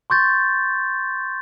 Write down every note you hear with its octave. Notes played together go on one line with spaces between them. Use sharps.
C6 C#6 G6 A6